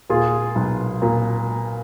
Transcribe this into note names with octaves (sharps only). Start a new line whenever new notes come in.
A#2 F4 G#4
B1
A#2